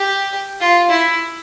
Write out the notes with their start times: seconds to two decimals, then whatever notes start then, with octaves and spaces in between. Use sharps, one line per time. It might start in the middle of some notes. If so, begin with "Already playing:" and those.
Already playing: G4
0.61 F4
0.90 E4